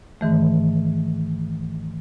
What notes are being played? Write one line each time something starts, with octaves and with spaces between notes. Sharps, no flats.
G#2 D#3 E3 A3